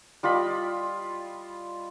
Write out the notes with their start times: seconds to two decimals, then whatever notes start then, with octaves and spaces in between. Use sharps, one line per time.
0.23 G3 F4 D#5 B5